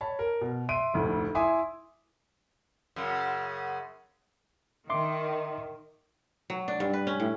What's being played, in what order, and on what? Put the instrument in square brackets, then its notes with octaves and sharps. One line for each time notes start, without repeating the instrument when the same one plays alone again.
[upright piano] C#5 A5 B5
A#4
B2
E5 C6 D7 D#7
F1 D2 A2
E4 E5 G#5 C6 D6 D#6
[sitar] F#2 C#3
[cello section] D#3 [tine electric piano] E5 C6 D6
[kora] F#3
D4
G2
B4
C#4
A2